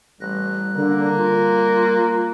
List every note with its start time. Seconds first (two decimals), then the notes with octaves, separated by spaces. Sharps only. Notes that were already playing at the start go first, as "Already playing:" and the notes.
0.20 A1 G3 F#6 A#6
0.76 D3 A#3
1.17 F4